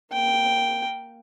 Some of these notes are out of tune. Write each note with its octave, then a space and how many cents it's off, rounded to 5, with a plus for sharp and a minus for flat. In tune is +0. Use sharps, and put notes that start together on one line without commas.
A#3 +0 G5 +0